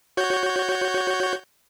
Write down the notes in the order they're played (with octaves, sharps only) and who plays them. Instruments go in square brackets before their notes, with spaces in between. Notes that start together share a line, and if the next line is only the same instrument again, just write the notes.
[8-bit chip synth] F#4 C#5 G6